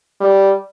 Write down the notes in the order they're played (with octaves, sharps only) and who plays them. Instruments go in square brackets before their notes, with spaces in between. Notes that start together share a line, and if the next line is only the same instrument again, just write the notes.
[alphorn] G3